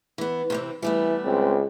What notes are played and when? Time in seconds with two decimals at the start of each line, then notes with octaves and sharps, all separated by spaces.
0.18 E3 B3
0.50 C3 E3 C4
0.82 E3 G3 A3 B3
1.25 C#2 C4